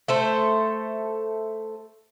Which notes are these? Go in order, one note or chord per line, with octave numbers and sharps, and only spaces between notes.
A3 A4 C5